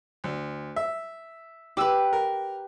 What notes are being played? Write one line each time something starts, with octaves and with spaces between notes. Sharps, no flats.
D2
E5
G4 B4 D6 E6
A#4